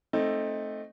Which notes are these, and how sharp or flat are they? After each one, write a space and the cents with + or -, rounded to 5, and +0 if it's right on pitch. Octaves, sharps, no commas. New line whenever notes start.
A3 +0 C4 +20 D#4 +0